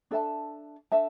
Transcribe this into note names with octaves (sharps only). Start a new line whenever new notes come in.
D4 A4 E5 A5
D4 A4 E5 A5